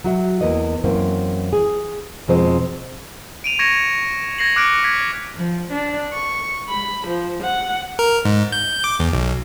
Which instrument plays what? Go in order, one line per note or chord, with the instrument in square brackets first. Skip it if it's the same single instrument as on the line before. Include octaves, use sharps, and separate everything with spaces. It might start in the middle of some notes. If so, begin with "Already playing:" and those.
[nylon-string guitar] F#3 F#4 E5
E2 A#3 B3 E4 D#5
F#2 E3 A#3 C4
G#4
F2 B2 F3 G#3 C4 C5
[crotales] D7 D#7 F7
C#6 G#6 A#6 C#7 E7
G#6 A#6 C7 F#7
D6 F6 F#6 C#7 D7
G#6 B6
[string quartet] F3
D4
C#6
B5
F3
F#5
[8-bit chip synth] A#4
G#2
G6
D6
E2
B1